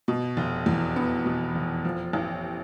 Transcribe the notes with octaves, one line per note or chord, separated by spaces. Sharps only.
B2
F1
E2
B3
B2
F1
F3
A1